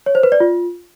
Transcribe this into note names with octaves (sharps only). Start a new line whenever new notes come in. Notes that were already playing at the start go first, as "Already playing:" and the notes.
C#5
C5
B4
D5
F4